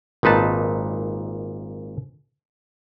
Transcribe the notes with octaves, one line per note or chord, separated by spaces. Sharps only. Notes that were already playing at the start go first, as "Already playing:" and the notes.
G#1 A#2 D#4 B4 A5